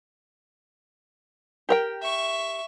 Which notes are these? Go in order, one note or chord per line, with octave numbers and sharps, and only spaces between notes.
G4 A#4 G5
E5 C#6